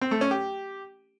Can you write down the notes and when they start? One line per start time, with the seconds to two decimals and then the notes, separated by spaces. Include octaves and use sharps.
0.01 C4
0.11 A3
0.21 C#4
0.31 G4